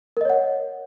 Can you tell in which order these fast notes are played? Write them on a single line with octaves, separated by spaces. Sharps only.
A#4 D#5 C#5 F#5